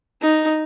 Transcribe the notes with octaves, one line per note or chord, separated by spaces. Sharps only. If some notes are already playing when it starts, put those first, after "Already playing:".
D#4